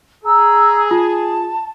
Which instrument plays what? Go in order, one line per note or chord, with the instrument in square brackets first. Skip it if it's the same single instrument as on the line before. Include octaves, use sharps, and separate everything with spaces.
[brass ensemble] G#4 [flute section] A#5 E6
[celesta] F4 [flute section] A5